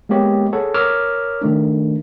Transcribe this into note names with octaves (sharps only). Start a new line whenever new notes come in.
G#3 A#3 B3 G4 C#5 D#5
G#4 A4 C#5 F#5
A#4 C#5 D6 E6 F6
D#3 A3 D4